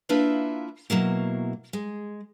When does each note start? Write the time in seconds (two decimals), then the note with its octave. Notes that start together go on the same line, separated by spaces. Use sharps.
0.09 A#3 D4 E4 F4 B4 E5
0.90 B2 F#3 A#3 E4
1.73 G#3